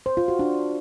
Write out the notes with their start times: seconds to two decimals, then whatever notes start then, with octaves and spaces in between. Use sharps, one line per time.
0.06 C5
0.17 F4
0.28 F#4
0.39 D4